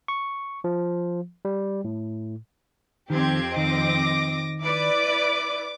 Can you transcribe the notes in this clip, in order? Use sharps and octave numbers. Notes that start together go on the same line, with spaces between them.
C#6
F3
G3
A2
F2 D#3 C4 G4 G#6
D#3 D#5 D6 A#6
E4 B4 D5 D6